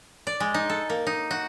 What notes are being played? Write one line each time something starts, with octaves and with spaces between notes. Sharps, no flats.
D5
G#3
D#4
A4
A#3
D#4
F#4